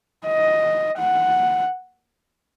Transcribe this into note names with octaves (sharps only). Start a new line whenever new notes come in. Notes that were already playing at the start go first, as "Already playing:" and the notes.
D#5
F#5